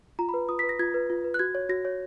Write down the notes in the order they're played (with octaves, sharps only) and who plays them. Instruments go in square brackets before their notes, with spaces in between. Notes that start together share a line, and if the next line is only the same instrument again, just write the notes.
[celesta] F4 A#5
B5
B4
F4 D#6
B6
B4
A#6
F4 G#6
B4
F4
B4
F#6
F#4 G#6
C#5
F#4 A#6
C#5